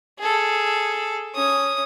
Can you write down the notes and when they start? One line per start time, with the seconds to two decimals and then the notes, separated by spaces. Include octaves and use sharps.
0.18 G#4 A4
1.35 C#4 D#6